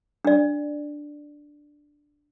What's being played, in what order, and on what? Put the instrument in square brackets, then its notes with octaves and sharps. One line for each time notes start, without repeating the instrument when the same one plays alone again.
[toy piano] D4 D5